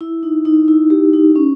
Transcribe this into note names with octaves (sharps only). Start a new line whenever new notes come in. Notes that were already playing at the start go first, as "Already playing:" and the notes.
E4
D#4
D#4
E4
G4
D#4
C#4